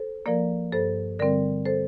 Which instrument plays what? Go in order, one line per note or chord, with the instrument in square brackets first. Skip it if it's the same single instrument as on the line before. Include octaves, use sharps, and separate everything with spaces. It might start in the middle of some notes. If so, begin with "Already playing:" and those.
Already playing: [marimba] A4 C5
F3 A#3 A#4 D5
G2 A4 C5
D3 G3 C4 A#4 D5
A4 C5